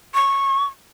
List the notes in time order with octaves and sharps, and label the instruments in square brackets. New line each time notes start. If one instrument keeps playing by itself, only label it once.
[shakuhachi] C#6